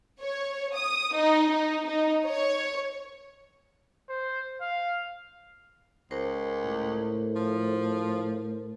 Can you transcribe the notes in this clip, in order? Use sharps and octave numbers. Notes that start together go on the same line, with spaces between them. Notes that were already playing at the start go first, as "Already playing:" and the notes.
C#5
D#6
D#4
D#4
D#4
C#5
C5
F5
C#2 A#4 C5
A2
F3